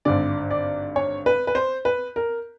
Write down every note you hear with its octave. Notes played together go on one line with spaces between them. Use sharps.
G#1 G2 D3 D5
D5
C#5
B4
B4
C5
B4
A#4